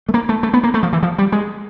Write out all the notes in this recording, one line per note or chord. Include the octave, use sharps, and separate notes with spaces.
A3
A#3
A3
A3
B3
A#3
A3
F3
E3
F3
G3
G#3